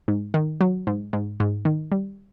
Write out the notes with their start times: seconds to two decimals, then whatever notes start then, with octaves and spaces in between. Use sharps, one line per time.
0.08 G#2
0.34 D#3
0.61 F#3
0.87 G#2
1.13 G#2
1.40 G#2
1.65 D#3
1.92 G3